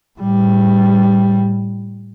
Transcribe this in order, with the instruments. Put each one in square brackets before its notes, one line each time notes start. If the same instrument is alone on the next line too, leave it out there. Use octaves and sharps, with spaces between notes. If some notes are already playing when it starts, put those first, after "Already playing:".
[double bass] A2 G3